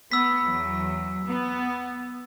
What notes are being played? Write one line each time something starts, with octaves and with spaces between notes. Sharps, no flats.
B3 E6 B6
E2 F#3
B3